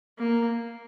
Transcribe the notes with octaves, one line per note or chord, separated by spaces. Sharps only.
A#3